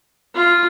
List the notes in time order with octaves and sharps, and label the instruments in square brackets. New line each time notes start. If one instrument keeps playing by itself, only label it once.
[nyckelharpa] F4